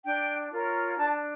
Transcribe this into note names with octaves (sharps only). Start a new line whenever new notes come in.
D4 G5
F4 A#4 C#5
D4 A5